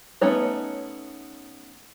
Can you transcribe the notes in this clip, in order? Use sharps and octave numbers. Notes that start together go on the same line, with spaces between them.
A3 B3 C#4 D#4 C#5